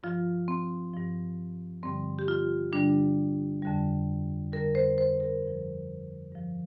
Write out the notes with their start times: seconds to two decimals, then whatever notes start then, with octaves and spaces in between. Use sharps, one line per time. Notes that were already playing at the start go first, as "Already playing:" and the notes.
0.03 G2 F3 F4
0.48 C4
0.93 G2 F3
1.83 G2 D3 G3 C4
2.19 G4
2.28 F4
2.72 G2 D3 G3 D4
3.63 F2 D3 G3
4.52 F2 D3 G3 A#4
4.75 C5
4.98 C5
5.20 A#4
5.42 G2 F3
6.32 G2 F3